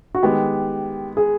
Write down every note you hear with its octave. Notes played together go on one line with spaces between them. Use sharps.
F#4
D#3 G#3 B3 G4
G#4